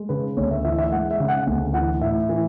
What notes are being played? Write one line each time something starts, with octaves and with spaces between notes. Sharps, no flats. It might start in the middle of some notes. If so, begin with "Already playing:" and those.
Already playing: G#3
C#3 B4
D2 C#5
E5
E3 E5
E5
G#3 F#5
E5
C#3
F#5
D2
E3 F#5
A2 E5
E3